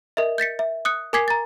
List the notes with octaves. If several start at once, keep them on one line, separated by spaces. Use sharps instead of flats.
A#4 D#5 E5
G6 A6 B6 C#7
E5
D#6 F#6 C#7
A#4 G#5 D6 G#6 B6 C7
A#5 A6